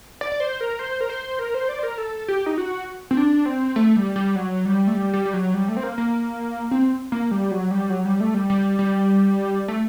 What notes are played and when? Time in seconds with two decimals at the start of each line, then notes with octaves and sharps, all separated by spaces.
0.21 D5
0.32 D5
0.40 C5
0.61 A#4
0.79 C5
1.01 A#4
1.10 C5
1.39 A#4
1.54 C5
1.69 D5
1.79 C5
1.83 A#4
1.98 A4
2.28 G4
2.46 D#4
2.58 F#4
3.11 C4
3.17 D4
3.46 C4
3.76 A3
3.96 G3
4.16 G3
4.36 F#3
4.65 G3
4.87 A3
4.94 G3
5.14 G3
5.25 G3
5.33 F#3
5.54 G3
5.68 A3
5.77 C4
5.83 A#3
5.98 A#3
6.71 C4
7.12 A#3
7.31 G3
7.51 F#3
7.71 G3
7.90 F#3
8.05 G3
8.20 A3
8.34 G3
8.50 G3
8.79 G3
9.68 A3